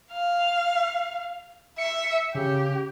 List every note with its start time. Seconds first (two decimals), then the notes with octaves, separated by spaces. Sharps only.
0.12 F5
1.78 E5 C#7
2.35 C#3 G4